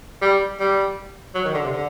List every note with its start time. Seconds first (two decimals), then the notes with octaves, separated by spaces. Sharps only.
0.22 G3
0.60 G3
1.35 F#3
1.44 D#3
1.54 D3
1.64 C3
1.73 D3